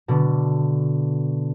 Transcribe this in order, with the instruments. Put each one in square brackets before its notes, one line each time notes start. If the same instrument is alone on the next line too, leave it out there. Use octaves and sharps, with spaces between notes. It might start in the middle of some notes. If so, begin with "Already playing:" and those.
[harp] B2 D3